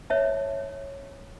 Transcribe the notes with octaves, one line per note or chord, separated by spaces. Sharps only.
C#5 E5 A5